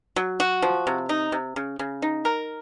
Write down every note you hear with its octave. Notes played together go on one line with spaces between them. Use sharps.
F#3
F#4
F3
C3
D#4
C3
C#3
C#3
D#4
A#4